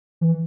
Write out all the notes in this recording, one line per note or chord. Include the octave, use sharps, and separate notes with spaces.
E3